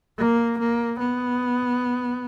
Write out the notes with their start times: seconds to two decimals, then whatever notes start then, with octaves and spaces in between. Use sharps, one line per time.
0.18 A#3
0.59 A#3
1.00 B3